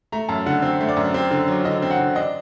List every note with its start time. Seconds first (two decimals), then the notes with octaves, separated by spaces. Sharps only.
0.12 A3 A#5
0.29 F#2 A5
0.46 D3 F#5
0.62 C4
0.80 A3
0.89 D5
0.97 F#2
1.14 C4
1.31 D3
1.48 F#3
1.64 D3 D#5
1.82 C4
1.91 F#5
1.99 D3
2.15 D4 D#5